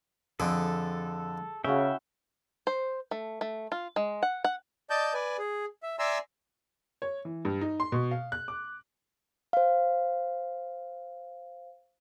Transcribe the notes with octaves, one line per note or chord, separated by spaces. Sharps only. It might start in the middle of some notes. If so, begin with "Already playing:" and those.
F2 D3 G#4 A4
C#3 C#4 E4 F#4 E5 G5
C5
A3
A3
F4
G#3
F#5
F#5
D5 D#5 A5 G6
B4 D5 G#5
G#4
E5
D5 E5 G#5 A#5 C6 E6
C#5
E3
G2
D#4
C6
B2
F5
F#6
D6
C5 F5